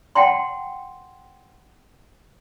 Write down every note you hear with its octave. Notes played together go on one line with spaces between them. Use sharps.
F#5 G5 A5 C6